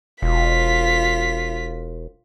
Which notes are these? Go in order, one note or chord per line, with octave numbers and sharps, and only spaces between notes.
E1 F4 B6